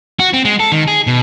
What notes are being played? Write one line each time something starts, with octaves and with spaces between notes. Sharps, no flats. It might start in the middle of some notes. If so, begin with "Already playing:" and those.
F#4
C4
G#3
A4
D#3
G#4
B2